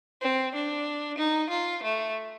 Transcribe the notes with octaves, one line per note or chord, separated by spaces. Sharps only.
C4
D4
D#4
F4
A3